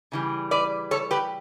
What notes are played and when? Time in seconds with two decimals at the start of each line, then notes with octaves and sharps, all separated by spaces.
0.12 C#3 E3 G3
0.51 B4 D5
0.91 A4 C#5
1.11 G4 B4